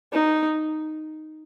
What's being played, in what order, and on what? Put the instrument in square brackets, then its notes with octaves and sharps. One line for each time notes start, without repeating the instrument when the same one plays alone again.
[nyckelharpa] D#4